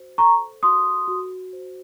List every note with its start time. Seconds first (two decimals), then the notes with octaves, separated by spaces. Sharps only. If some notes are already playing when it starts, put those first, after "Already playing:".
Already playing: F#4 C5
0.18 A4 A#5 C#6
0.63 F#4 C6 D#6
1.08 F#4
1.53 C5